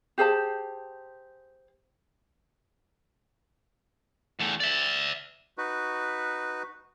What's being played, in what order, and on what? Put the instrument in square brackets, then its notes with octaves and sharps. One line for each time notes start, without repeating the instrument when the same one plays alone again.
[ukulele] G4 G#4 C5 A5
[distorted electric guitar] E2 A3
D5 E5
[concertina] D#4 F#4 B4